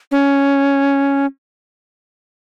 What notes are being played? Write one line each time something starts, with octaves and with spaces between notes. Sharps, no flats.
C#4